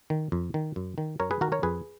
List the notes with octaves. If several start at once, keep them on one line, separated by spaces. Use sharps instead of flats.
D#3
F2
D#3
F#2
D#3
F#2 A#4 C#5
G#4 B4
D#3 F#4 A#4
A#4 C#5
F2 G#4 B4